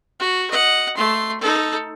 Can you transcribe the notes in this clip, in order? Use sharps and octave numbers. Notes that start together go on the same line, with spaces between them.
F#4
D#5 F#5
A3 C6
D#4 A4